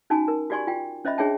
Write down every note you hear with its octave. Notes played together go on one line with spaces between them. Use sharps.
C#4 D#4 F#4 G#5 A5
A#4
F#4 G4 D5 G#5 C6
F4 G5
C#4 C5 D#5 E5 B5
D4 G#4 C#5 E5 G5 A5